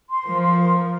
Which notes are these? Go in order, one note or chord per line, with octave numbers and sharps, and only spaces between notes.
C6
F3 A#4
C6
A#4
A#4